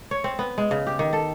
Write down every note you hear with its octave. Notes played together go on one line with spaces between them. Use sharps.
C#5
C4
B3
G#3
C#3
G4
D#3
A4